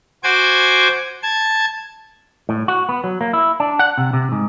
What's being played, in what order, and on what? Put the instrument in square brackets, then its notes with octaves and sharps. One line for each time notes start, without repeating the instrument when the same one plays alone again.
[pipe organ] F#4 C5 G#5 D6 G#6
A5 G#6
[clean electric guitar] A2
F#4
B3
F#3
A#3
E4
D4
F#5
C3
C3
G#2